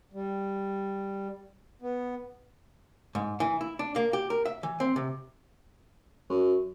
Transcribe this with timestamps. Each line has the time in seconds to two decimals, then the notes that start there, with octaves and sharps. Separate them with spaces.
0.13 G3
1.82 B3
3.15 G#2
3.40 E3
3.61 E4
3.79 D4
3.96 A#3
4.13 G4
4.30 A#4
4.46 E5
4.63 E3
4.80 C4
4.96 C3
6.30 F#2